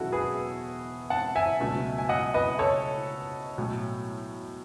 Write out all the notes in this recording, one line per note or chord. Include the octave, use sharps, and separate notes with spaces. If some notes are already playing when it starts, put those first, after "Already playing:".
Already playing: E1 E2 D#3 F#3 C#4 E4 F#4 A4
G#4 B4
F#5 A5
E5 G#5
C#2 B2 F#3 A3
G#5
D#5 F#5
B4 D#5
A4 C#5
B1 A2 F#3 A3